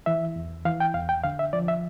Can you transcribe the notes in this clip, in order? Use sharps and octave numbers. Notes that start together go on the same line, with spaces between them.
E3 E5
E2
E3 F5
G5
E2 F5
G5
D3 F5
E5
F3 D5
E5